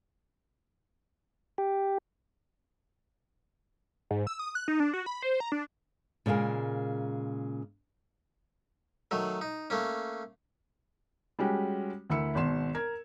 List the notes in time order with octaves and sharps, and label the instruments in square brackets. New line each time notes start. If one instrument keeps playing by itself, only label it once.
[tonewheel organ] G4
[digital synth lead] G#2
E6
D#6
F#6
D#4
D4
F#4
B5
C5
A#5
D4
[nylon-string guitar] A#2 C#3 G#3 A#3 A#4
[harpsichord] D#3 F#3 A3
D#4
A3 A#3 C#4
[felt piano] G3 G#3 C#4 F#4 G4
D2 E4 A#4 B5 E6 C#7
G#1 B2 C6 E7
A#4 G#6